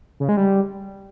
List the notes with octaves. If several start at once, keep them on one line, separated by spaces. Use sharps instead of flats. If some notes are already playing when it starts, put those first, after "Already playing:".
C#3
G#3
G3